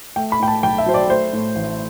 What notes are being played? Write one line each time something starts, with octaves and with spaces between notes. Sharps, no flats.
A3 G5
B5
A2 G5
A5
B1 G5
E5
F#3 C5
D5
A3 C5
A2
A1